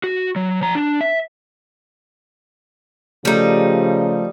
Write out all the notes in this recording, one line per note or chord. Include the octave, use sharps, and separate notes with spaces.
F#4
F#3
F3 A#5
D4
E5
C#3 F3 G3 A3 D#4